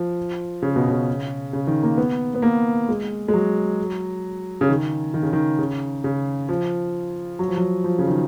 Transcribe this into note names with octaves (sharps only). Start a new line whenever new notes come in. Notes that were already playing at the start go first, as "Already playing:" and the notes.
Already playing: F3
C#3
B2
C#3
C#3
D#3
A#3
B3
B3
A#3
G#3
G#3
F#3
C#3
D#3
D#3
C#3
D#3
C#3
C#3
F3
F#3
F3
F#3
F3
C#3
D#3